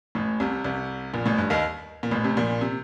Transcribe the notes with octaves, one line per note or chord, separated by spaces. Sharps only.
A1 A2
C2 C3
C2 C3
A#1 A#2
A1 A2
G2
D#2 D#3
A#2
A1 A2
C3
A#1 A#2
C3